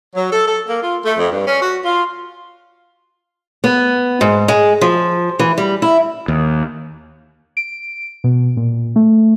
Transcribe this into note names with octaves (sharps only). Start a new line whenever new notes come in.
F#3
A4
A4
A#3
F4
A3
F2
G2
C#4
F#4
F4
B3
G#2
G#3
F3
E3
G3
E4
D#2
D7
B2
A#2
A3